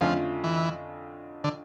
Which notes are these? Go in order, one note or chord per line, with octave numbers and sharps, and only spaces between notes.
F2 D3 F3 A3 C#4 F4
E3
D3